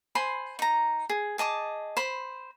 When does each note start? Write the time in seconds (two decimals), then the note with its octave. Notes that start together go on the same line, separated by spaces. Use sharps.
0.15 C5 G#5 B5 C6
0.59 D#4 A#5
1.10 G#4
1.38 G#4 D#5 A5 D6
1.97 C5 B5